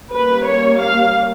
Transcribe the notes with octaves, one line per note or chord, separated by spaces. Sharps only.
G3 A#3 C#4 B4
C#5
F5